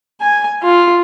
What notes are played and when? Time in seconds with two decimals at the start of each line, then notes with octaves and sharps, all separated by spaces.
0.20 G#5
0.63 F4